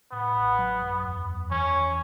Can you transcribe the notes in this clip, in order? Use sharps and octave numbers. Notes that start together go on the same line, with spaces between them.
A2 B3
A1
F#3
F#2
E2
E2
E3 C#4
E3